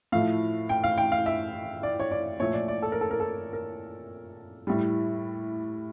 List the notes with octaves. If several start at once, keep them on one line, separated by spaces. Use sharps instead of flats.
A2 F3 A3 F5
G5
F5
G5
F5
E5
D5
C#5
D5
A#2 F3 A3 C#5
D5
D5
A4
A#4
A4
A#4
A4
A#4
A2 G3